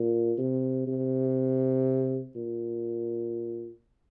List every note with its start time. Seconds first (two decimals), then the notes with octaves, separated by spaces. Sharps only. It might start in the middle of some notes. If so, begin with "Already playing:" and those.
Already playing: A#2
0.38 C3
0.87 C3
2.35 A#2